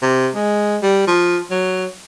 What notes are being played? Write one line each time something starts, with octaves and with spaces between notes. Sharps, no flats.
C3
G#3
G3
F3
F#3